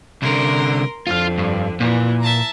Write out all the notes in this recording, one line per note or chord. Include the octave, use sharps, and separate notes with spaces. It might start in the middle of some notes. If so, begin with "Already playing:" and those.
C2 D3 A#4 C6
F2 D3 F4 F5
G2
A#2 E3
E5 A5 A#5